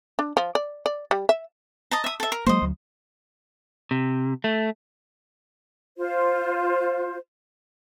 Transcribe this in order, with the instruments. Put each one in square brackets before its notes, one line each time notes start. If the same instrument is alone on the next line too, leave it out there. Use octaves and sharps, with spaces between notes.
[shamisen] D4
F3
D5
D5
G3
E5
[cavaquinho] D#5 A5 A#5
E5 D#6
A4 E5
A#4
[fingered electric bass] F#3 G#3 A#3 [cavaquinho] C5 D#5
[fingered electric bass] D2 F#3
[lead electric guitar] C3
A3
[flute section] F4 C5